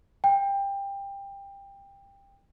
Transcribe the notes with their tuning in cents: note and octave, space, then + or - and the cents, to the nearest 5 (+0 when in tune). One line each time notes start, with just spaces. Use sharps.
G5 +20